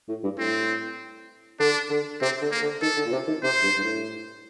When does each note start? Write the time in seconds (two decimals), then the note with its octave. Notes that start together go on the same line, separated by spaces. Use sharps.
0.08 A2
0.24 G2
0.38 A2 C4
1.60 D3 D4
1.90 D3
2.21 C3 C4
2.42 D3
2.51 A#3
2.61 D3
2.82 D#3 A4
2.97 D3
3.06 A#2
3.12 C3
3.28 D#3
3.43 C3 C5
3.63 G2
3.77 G2
3.83 A2